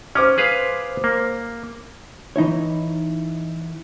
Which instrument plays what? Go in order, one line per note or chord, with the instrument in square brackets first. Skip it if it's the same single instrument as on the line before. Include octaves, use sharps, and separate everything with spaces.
[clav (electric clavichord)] C#4 [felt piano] C5 D6 F6
[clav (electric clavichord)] G#4 B4 F5
A#3
[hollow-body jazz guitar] E3 D#4 E4 C#5